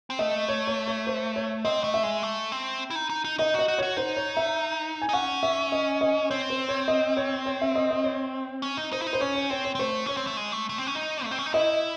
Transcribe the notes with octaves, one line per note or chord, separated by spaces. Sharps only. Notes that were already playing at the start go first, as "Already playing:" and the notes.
C4
A3 D#5
C#5
C#5
C#5
C5
C#5
C4 D#5
A3
E5
G#3
A3
C4
E4
D#4
D#4
D#4
D#4 D#5
F#4 D#5
F#4
F#4 C#5
D#4 C5
C#5
E5
G#5
D#4
C#4 F#5
E5
D#5
D#5
C4 C#5
C5
C#5
D#5
C#5
C#5
E5
D#5
D#5
C#5
C#4
D#4
D#4 C5
E4
D#4
C5
C#4 C#5
C#5
C4 C#5
C#5
C4
A3 C5
C#4 C#5
C4
A3
G#3
A3
A3
C4
C#4
D#4
A3
C4
C#4
D#4
E4 D#5